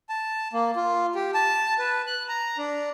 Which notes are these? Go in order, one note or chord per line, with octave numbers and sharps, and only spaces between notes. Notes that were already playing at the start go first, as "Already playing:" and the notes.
A5
A#3
F4
G4
A5
B4
F#6
A#5
D4